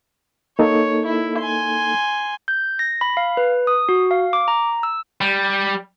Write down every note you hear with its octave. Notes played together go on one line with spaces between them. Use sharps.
A#3 D#4 A4 C#5
E4
G#5 C6
G6
A#6
B5
F5
B4
D#6
F#4
F5
D6
A#5
E6
G3